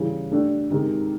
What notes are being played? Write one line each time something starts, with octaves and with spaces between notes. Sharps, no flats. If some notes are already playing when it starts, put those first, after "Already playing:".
Already playing: C#3 E3 G3
A3 D4 G4
C3 D#3 G#3